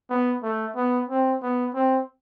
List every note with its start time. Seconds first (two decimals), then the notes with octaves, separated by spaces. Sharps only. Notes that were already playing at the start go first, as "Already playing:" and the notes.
0.10 B3
0.43 A3
0.76 B3
1.09 C4
1.42 B3
1.74 C4